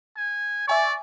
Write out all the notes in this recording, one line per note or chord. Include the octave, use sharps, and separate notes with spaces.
G#5
D5 E5 G#5 C#6